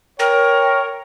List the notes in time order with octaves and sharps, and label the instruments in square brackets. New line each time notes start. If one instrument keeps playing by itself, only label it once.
[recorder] A#4 [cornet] C#5 [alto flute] G5